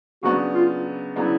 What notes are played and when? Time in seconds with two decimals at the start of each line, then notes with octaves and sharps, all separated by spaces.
0.23 C#3 F#3 B3 D4 F#4
0.54 F4
1.16 C#3 F#3 B3 D4 E4